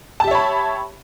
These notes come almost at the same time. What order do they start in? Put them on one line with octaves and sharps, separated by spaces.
A5 G4 E5 C#5 B5